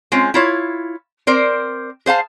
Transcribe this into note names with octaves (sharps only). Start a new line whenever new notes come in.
G#3 C4 C#4 F4
E4 F4 C#5
C4 A#4 C5 D5
G#4 C5 F5 A5